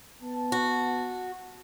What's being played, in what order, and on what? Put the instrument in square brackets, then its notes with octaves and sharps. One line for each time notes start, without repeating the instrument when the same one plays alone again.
[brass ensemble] B3 A5
[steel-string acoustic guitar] F#4